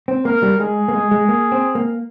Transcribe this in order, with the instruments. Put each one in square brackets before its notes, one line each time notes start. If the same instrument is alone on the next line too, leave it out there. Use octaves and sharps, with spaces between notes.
[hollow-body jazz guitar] C4
[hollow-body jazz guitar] A#3 [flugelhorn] A#4
[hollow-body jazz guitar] G3
[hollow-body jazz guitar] G#3 [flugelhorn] G#4
[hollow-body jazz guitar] A#3
G#3
G#3
A#3
C4
A#3